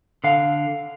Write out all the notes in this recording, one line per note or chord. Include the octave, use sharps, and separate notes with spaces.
D3 F5